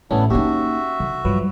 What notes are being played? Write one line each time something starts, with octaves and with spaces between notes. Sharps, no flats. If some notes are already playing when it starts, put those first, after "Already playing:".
A1 A3 B3 C#4 D4 E4
A#3 C#4 D#4 F#4 G4 E5
D3
G2 F3 F#3 G#3 B4